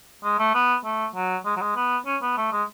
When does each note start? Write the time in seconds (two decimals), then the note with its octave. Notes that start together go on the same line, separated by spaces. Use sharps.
0.24 G#3
0.39 A3
0.54 B3
0.85 A3
1.15 F#3
1.45 G#3
1.57 F#3
1.61 G#3
1.76 B3
2.06 C#4
2.22 B3
2.37 A3
2.52 G#3